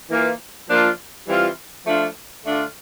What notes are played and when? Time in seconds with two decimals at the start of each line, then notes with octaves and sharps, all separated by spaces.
0.10 E3 A#3 F4
0.68 F3 A#3 D4 F4
1.27 E3 G3 C4 F4
1.84 F3 A3 D4 F4
2.43 D3 A3 D4 F4